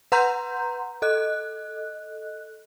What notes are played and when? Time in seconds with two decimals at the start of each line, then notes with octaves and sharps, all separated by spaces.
0.12 B4 F#5 A#5 C6 G6
1.02 A4 D#5 F#6